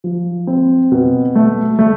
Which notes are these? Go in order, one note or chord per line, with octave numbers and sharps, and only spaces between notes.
F3
C4
B2
A3
A3